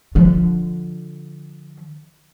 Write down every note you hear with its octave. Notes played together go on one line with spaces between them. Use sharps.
D3 F3